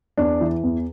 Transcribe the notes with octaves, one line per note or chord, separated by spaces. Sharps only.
E2 D4
E3
E2